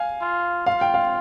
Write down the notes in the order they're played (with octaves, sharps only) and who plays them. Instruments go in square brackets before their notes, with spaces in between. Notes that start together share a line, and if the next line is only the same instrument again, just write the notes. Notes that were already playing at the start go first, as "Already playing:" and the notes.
Already playing: [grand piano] F5 G#5
[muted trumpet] F4
[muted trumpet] F4 [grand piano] F5
[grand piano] G5
F5